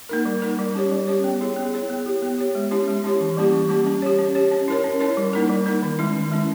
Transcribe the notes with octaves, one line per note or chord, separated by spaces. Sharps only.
A#3 D#4 A#4
G3
A#3 D#4 A#4
G3
C#4 G4 C#5
G3
C#4 G4 C#5
B3
E4 G#4 C#5
B3
E4 G#4 C#5
B3
G4 C#5
B3
G4 C#5
G#3
C#4 E4 G4 C#5
G#3
C#4 E4 G4 C#5
E3
G3 A#3 C#4 G4
E3
G3 A#3 C#4 G4
C#4
G4 C#5
C#4
G4 C#5
C#4
E4 A#4 C#5
C#4
E4 A#4 C#5
G3
A#3 D#4 A#4
G3
A#3 D#4 A#4
D#3
G#3 C#4 E4
D#3
G#3 C#4 E4